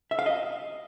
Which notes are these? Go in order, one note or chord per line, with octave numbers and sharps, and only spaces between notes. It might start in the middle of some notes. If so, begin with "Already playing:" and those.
E5
F5
D#5